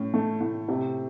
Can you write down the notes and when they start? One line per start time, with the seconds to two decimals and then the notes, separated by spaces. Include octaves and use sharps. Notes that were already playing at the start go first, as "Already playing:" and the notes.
Already playing: A2 C#4
0.14 A3
0.41 A2
0.68 C3